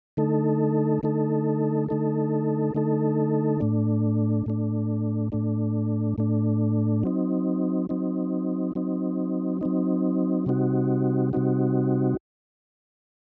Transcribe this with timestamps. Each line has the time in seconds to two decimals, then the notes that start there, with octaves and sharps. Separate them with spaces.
0.17 D3 A3 D#4 A4
1.03 D3 A3 D#4 A4
1.89 D3 A3 D#4 A4
2.75 D3 A3 D#4 A4
3.60 A2 A3 D4
4.46 A2 A3 D4
5.32 A2 A3 D4
6.18 A2 A3 D4
7.03 F#3 C4 D#4
7.89 F#3 C4 D#4
8.75 F#3 C4 D#4
9.61 F#3 C4 D#4
10.46 C3 G3 C4 D#4 F#4
11.33 C3 G3 C4 D#4 F#4